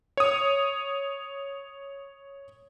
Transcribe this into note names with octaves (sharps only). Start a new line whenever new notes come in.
C#5 D#6